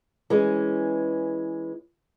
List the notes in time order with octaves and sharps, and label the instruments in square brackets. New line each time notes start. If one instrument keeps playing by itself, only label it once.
[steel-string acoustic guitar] E3 G#3 C#4